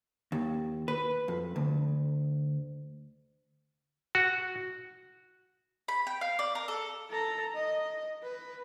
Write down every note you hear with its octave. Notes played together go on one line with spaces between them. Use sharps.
D#2
B4
F2
D2
F#4
B5
G5
F5
D5
A#4
A4
A4 A#5
D#5
B4